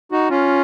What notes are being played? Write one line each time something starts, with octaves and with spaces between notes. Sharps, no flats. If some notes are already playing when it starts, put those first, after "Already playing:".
D#4 F#4
C#4 F4